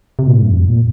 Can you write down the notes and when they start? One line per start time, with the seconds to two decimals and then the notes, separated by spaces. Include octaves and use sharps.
0.19 C3
0.27 A#2
0.35 A2
0.42 G2
0.50 F2
0.68 A#2